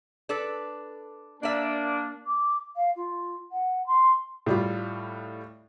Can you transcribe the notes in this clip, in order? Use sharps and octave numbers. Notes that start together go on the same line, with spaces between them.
D4 A4 B4
A#3 D4 D5 E5
D6
F5
F4
F#5
C6
A2 G3 F4